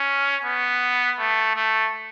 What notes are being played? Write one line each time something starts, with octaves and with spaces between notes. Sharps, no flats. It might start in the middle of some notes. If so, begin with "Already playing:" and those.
Already playing: C#4
B3
A3
A3